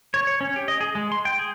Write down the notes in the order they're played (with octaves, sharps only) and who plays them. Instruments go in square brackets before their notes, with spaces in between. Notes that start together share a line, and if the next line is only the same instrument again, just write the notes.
[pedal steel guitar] C#5
C#5
C#4
G4
D#5
G#4
G#3
C6
G5
G#4